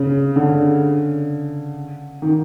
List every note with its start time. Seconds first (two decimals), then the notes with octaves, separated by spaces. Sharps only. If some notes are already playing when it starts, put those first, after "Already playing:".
Already playing: C#3
0.36 D3
2.22 D#3